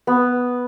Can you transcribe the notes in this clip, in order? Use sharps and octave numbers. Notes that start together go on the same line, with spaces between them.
B3